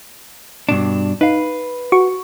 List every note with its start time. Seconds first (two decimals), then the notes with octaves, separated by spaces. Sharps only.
0.69 G2 B2 D4
1.21 D#4 B4 F5
1.92 F#4 C#6